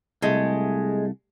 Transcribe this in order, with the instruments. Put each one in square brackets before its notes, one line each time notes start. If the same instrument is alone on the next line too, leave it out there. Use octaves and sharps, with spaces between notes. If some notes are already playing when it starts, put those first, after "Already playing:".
[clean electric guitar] C2 A3 [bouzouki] G#3